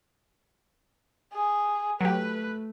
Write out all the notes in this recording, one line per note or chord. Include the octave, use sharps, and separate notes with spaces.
G#4
F#3 A3 G4 B4